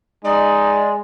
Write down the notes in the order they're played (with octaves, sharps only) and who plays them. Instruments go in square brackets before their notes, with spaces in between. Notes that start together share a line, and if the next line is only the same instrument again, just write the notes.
[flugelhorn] G#3 [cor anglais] D#4 [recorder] D5